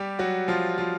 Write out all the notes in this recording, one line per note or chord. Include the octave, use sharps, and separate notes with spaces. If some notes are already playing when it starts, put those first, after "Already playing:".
Already playing: G3 G4
F#3 F#4
F3 F4
F3 F4